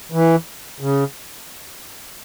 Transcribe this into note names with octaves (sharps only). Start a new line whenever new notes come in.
E3
C#3